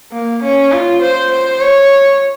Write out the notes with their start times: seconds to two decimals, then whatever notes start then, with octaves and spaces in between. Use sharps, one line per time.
0.12 A#3
0.43 C#4
0.72 F4
1.02 C5
1.31 C5
1.61 C#5